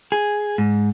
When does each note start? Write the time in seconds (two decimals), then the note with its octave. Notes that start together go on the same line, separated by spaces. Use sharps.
0.12 G#4
0.58 G#2